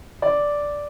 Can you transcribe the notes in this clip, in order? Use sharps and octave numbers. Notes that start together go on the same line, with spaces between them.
D5